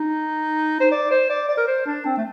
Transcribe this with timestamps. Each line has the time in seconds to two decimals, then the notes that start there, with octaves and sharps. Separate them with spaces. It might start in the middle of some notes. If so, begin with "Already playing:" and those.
Already playing: D#4
0.80 C5
0.91 D5
1.11 C5
1.30 D5
1.49 D5
1.57 A#4
1.67 C5
1.86 D4
2.05 C4
2.17 A3